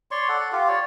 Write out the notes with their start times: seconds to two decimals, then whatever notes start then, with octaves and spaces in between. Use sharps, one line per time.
0.11 C#5 D5 C6 C#6
0.29 A4 F#5
0.52 F4 G4
0.68 C#5 D5